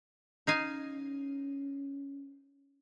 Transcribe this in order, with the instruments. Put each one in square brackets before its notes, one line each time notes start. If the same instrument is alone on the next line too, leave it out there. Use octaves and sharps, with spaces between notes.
[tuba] C#4 [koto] D#4 F5 G#5